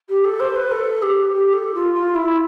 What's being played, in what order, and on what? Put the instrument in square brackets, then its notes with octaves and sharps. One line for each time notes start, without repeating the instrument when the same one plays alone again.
[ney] G4
A4
C5
B4
A4
G4
G4
A4
F4
F4
E4